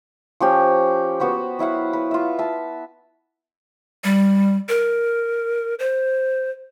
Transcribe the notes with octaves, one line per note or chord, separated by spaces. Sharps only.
F3 C#4 G4
B3 F#4 B4 C5
F#3 E4 F5 F#5
B4
F4 E5
E5 A5
G3
A#4
C5